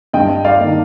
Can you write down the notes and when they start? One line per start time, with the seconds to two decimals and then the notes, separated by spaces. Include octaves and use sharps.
0.13 G2 D#5 G5
0.44 D5 F5
0.60 D#3 A#3